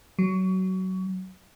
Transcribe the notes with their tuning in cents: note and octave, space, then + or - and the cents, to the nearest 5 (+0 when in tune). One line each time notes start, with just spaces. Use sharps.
F#3 +20